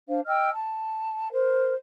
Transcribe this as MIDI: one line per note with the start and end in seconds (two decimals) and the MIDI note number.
0.07 0.19 62
0.07 0.19 72
0.07 0.19 77
0.25 0.49 75
0.25 0.49 79
0.25 0.49 88
0.25 0.49 89
0.51 1.27 81
1.30 1.72 70
1.30 1.72 72